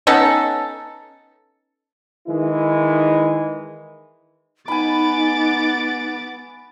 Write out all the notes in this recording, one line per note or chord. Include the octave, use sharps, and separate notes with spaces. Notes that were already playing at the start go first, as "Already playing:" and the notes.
B3 C#4 D#4 A4
D#3 E3 G#3 D#4 E4
B3 D#4 G#5 B5 D6 A6